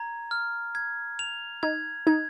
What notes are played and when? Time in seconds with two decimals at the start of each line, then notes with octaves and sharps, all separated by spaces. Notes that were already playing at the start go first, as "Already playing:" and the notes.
Already playing: A#5 G#6
0.31 F6
0.75 G#6
1.19 F7
1.63 D#4 G#6
2.07 D#4 G#6